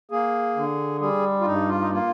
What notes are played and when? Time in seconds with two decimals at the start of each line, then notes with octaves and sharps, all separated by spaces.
0.11 A#3 G#4
0.56 D3
1.01 G3 G#4
1.41 F4
1.46 G2 D#4
1.69 F4
1.81 D#4
1.91 A#3 F4